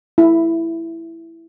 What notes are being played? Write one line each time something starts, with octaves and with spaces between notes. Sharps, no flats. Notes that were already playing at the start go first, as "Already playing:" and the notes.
E4